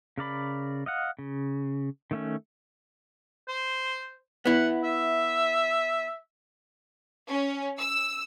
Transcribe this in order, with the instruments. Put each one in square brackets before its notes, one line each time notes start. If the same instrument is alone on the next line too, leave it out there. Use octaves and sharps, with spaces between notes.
[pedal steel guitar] C#3 A#4 D5 B5
D#5 F5 F#5
C#3
D#3 A3 C#4
[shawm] C5
[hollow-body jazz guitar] B3 E4 [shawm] F#5
[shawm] E5
[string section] C#4
E6